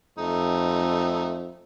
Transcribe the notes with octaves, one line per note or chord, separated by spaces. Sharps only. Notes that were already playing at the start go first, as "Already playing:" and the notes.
F2 A3 D#4